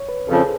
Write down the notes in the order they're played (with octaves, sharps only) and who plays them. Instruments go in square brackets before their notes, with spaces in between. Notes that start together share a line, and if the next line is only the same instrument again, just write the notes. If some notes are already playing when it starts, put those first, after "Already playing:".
Already playing: [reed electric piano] C#5
B4
[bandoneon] F2 C#3 F3 [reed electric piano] A4
[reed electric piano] G#4